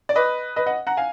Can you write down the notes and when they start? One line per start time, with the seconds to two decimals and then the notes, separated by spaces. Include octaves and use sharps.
0.09 D5
0.16 B4 D#5
0.56 B4 D#5
0.66 D#5 F#5
0.87 F#5 A#5
0.97 F5 G#5